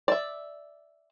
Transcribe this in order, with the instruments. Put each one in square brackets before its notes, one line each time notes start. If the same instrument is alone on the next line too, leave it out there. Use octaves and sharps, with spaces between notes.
[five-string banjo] D5 E5